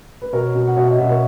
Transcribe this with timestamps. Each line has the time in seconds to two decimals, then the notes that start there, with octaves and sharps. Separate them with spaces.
0.22 B4
0.33 B2 A#4 C#5
0.55 B2
0.67 F#5
0.76 B2 C#5 E5
0.88 D#5 F#5
0.98 B2 C#5 E5
1.09 A#4 C#5